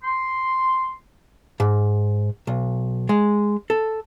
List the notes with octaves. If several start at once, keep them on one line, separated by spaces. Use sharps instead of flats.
C6
G#2
B1
G#3
A4